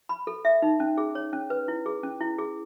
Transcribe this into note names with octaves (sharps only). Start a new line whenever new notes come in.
B5
A4
E5
D#4
C#4
G#4
C#5
C#4
B4
E4
G#4
C#4
E4
G#4